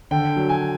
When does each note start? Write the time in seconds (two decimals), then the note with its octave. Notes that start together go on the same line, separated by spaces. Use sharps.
0.11 D3 G5
0.36 F#3
0.49 G#5